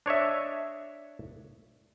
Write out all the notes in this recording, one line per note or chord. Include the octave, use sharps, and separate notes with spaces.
D4 C#5 D#5 E5